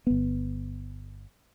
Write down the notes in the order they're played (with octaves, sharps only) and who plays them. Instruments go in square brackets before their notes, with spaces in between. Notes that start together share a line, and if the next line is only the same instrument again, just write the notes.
[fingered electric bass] G1 B3